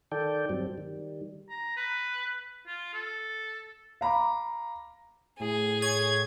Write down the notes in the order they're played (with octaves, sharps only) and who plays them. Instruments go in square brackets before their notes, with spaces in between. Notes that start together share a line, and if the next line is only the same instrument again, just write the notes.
[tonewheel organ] D#3 A4 D5 G5
G2 F#3 G3 C4
D#3 G3
[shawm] A#5
B4
F4
A4
[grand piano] F5 A#5 B5 D6
[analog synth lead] A2 [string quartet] G#4
[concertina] C#5 [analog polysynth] G#6